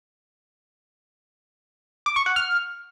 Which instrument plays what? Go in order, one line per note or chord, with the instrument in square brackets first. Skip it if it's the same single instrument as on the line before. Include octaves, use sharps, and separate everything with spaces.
[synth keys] D6
C#6
F#5
F6